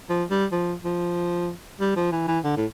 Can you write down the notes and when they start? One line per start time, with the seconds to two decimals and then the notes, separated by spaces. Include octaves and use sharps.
0.09 F3
0.30 G3
0.52 F3
0.84 F3
1.80 G3
1.96 F3
2.12 E3
2.28 E3
2.44 D3
2.57 A2